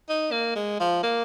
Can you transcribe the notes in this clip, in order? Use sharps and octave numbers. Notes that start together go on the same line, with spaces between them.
D#4
A#3
G#3
F3
A#3